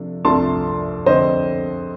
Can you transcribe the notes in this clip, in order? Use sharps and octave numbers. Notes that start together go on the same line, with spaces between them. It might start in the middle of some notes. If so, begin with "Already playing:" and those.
Already playing: C3 F3 A3 D4
C2 C3 F3 A3 D4 A5 C6
F2 D3 A3 C4 C5 D#5